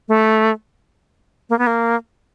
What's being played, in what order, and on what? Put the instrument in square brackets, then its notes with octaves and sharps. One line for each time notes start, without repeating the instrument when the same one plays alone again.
[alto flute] A3
A#3
B3
A#3